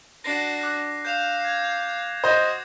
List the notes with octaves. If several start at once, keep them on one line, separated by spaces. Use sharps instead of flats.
D4 F#4 A#6 C7
D6 F#6
F5 G6 E7 F7
G#6
F#4 C5 D#5 D#6